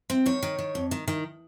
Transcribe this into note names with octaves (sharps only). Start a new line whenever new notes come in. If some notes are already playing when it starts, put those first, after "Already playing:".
C4
D#3 C#5
D#3
D#3
F2
D#3
D#3